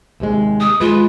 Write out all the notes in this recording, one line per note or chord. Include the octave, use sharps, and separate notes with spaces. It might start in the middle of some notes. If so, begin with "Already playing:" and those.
D#2 C3 G#3
D#6
D#2 G#3 F4 B4